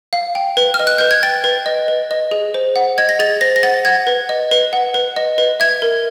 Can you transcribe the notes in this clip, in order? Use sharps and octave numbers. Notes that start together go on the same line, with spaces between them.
F5
G5
B4
F6
D#5
F#6
B4 G6
G#6
G5 A6
B4
D#5
B4
D#5
G#4
C5
F#5
D#5 G#6
A#6
G#4 A6
C5 A#6
A#6
F#5 A6
F#5 G#6
B4
D#5
B4
F#5
B4
D#5
B4
E5 G#6
A#4